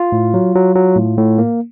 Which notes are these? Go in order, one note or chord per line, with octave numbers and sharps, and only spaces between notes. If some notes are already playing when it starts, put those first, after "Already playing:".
Already playing: F4
A2
F#3
F#3
F#3
A2
A2
A#3